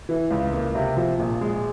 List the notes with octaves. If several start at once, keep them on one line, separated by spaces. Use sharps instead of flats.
E3
C#2
A#3
C3
F3
A#1
G#3